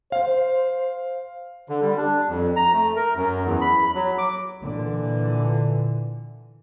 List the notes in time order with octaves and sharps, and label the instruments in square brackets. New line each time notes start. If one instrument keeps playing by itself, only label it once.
[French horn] C5 [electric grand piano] F5
[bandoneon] D3
G3
D4
F2
A#5
A3
A#4
F#2
E2
B5
F#3
D6
[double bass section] A#2 D3 E3